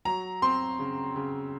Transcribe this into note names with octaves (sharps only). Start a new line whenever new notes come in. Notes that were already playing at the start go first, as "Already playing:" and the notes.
F#3 A#5
C4 C6
C#3
C#3